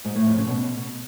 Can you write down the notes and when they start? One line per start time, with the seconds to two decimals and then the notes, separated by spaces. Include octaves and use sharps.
0.05 G#2
0.15 A2
0.26 F2
0.37 C#3
0.48 B2